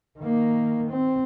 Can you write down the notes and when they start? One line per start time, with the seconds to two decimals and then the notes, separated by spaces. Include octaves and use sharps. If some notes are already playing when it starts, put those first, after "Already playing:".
0.19 D#3 A#3
0.91 C4